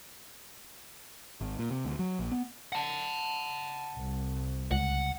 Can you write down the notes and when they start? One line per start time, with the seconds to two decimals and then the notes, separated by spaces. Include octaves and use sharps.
1.41 G#1
1.59 A#2
1.71 C3
1.85 D2
1.99 F#3
2.19 A#1
2.32 B3
2.72 F#5 A5
3.97 C2
4.71 C#2 F#5